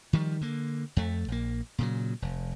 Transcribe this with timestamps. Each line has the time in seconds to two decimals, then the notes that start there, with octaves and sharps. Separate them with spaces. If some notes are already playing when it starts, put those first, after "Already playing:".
0.13 D#3 F3 G3
0.41 D3 A#3
0.97 F2 A3
1.28 A#1 A#3
1.78 A#2 C#3 F#3
2.22 F1